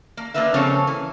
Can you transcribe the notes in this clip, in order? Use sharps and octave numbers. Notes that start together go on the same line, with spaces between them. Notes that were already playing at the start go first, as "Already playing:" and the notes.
A#3
A#3 D4 F4 A#4 B4 E5
C#3 F3 A#3 C4 A4 C#5
E3